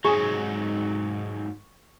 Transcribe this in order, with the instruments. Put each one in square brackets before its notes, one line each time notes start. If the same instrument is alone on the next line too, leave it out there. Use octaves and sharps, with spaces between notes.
[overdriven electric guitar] G#2 F#3 [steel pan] G#4 [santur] C#6